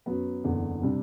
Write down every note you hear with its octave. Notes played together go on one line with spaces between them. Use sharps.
F#2 F#3 B3
F#1 E2 D3
C3 G3 D4